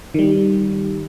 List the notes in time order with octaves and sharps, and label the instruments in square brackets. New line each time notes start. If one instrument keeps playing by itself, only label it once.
[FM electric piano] D#3 G3